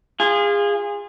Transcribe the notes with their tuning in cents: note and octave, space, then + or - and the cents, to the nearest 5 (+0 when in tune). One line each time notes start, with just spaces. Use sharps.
F4 +0 G#4 -25